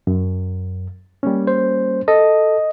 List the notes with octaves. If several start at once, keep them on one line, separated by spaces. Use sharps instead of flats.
F#2
G3 A#3 C#4
C5
A4 D#5